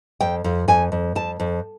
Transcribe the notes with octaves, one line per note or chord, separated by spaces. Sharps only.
F2 G5
F2
F2 G#5
F2
F2 A5
F2